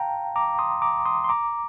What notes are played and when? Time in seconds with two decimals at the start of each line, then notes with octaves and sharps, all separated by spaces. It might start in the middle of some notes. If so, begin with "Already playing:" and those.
Already playing: F5 G5 A5 A#5
0.36 A#5 D6
0.59 C6 D#6
0.82 A#5 D6
1.05 C6 D#6
1.24 C6
1.29 A#5 D6